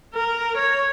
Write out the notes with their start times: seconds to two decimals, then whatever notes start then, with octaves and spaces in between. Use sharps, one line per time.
0.14 A#4
0.57 C#5